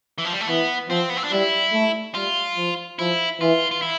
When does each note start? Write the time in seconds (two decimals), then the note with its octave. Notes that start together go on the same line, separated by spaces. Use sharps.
0.18 E3
0.25 F3
0.33 G3
0.41 A3
0.48 E3 B3
0.89 F3 C4
1.10 B3
1.17 C4
1.24 D4
1.32 G3 E4
1.73 A3
2.15 G3 F4
2.57 F3
2.99 F3 E4
3.40 E3 F4
3.71 F4
3.82 E4